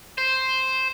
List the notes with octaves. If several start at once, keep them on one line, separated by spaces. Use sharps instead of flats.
C5